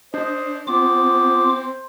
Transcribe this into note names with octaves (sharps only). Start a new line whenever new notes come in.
D4 C5 D#5
B3 C4 F4 C5 D6